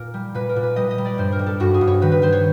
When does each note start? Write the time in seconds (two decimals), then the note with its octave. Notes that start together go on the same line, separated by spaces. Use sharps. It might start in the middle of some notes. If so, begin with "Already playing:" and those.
Already playing: A#2 A#4
0.14 G3
0.34 A#2 B4
0.49 A#4
0.56 A#2
0.63 B4
0.76 G3 D#5
0.91 D#5
0.98 G3
1.05 D5
1.18 G2 C5
1.32 A#4
1.39 G3
1.46 A4
1.60 G2 F#4
1.74 G#4
1.81 G2
1.87 C#5
2.02 D#3 B4
2.12 B4
2.22 D#3 C5
2.32 C#5